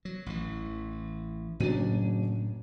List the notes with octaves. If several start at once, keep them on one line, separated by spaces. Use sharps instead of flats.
F#3
A1 E3
F#1 A2 F#3 D4 D#7